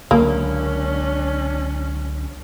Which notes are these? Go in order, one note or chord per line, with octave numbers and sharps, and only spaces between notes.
C#2 D3 F#3 A#3 C#4 D4